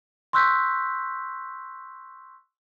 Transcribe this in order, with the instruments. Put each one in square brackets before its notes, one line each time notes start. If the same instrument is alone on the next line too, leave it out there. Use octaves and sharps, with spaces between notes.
[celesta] C6 C#6 E6 F#6 G6 B6